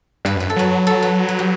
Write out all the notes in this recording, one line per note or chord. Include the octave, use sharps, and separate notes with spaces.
G2 B4
F#2 B4
A4
F#3 B4
A4
B4
B4
G4